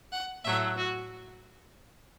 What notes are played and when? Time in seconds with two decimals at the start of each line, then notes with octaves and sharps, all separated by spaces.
0.11 F#5
0.44 A2 F#3 A3 E5
0.77 F#4